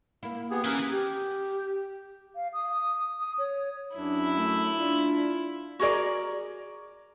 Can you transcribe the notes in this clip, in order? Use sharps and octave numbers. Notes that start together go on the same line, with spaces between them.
A#3 E4
B3 G4 G#4
E3 C#4 A#4
G4
F5
D#6
D#6
C#5
F#2 D4 E4
A3
D4 F4
F#4 G#4 A#4 D5